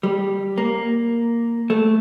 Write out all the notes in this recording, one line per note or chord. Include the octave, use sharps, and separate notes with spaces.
G3
A#3
A3